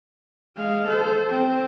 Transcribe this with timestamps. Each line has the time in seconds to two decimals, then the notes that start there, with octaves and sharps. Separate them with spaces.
0.57 G#3 F5
0.88 A4 C5
1.29 C4